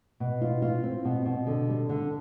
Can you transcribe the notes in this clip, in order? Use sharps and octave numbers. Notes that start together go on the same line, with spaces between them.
B2
F4
F4
C4
B2
B2
D3
G3
D3